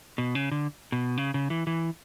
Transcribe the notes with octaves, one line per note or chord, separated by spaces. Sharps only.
B2
C#3
D3
B2
C#3
C#3
E3
E3